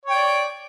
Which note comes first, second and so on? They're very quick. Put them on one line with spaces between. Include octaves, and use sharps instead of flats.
C#5 G5 D5